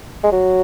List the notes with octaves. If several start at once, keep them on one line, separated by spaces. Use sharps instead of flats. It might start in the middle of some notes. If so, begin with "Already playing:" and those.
G#3
F#3